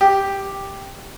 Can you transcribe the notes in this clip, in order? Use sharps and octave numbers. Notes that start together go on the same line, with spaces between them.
G4